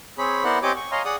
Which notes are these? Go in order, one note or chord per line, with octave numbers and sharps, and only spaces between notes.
C4 G#4 C#5 B5
B3 E4 A#4 C5 D5 F#5
C4 G4 C#5 D#5 G#5 D6
C#6
C#5 D#5 F5 G#5 A#5 C6
G#4 D5 F#5 D#6